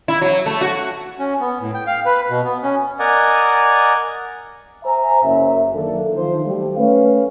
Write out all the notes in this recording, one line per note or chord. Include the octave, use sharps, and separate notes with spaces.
E4
F#3
A3
F#4
C#4
B3
A2
G5
F5
B4
B2
B3
C#4
A#4 D5 D#5 F#5 G#5
C5 E5 G#5 A#5
F#1 F#2 E5
D#3 F#3 A#3 D4 A4
D#3 F3 C5
F#3 G3 A3 G4
A3 C#4 B4 F5